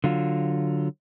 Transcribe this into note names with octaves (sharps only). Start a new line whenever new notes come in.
D3 F#3 F4